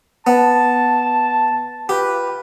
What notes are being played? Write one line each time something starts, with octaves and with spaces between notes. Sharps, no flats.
B3 A5
F4 G4 B4